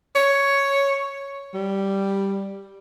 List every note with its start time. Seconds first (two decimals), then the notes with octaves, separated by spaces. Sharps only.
0.15 C#5
1.54 G3